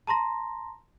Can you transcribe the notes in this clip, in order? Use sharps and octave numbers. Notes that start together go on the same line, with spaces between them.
A5 A#5 C6 A#6